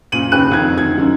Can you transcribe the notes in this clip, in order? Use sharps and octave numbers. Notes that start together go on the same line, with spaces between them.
F#1 A#2 D#7 F#7
D#2 C#3 B4 G5 F#6 D#7
A#1 F2 D#3 G#6
D2 D#3 G#6
F#2 D#3